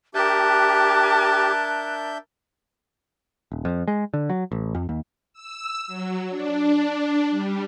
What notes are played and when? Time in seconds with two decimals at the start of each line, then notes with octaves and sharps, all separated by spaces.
0.15 D4 G4 A#4 E5 A5 F#6 G6
3.52 D#1
3.65 F2
3.88 G#3
4.14 D3
4.30 F#3
4.52 A1
4.75 F2
4.89 D#2
5.33 E6
5.87 F#3
6.30 D4
7.30 G3